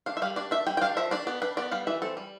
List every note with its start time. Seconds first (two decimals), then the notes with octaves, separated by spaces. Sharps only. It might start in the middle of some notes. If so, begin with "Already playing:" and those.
0.06 D4 F5
0.17 E5
0.22 G3 F5
0.36 D4 D5
0.51 D4 E5
0.67 G3 G5
0.77 G5
0.81 D4 F5
0.97 F3 E5
1.11 D4 D5
1.27 B3 D5
1.42 D4 B4
1.57 B3 D5
1.71 G3 F5
1.87 E3 E5
2.02 C4 A4
2.17 G3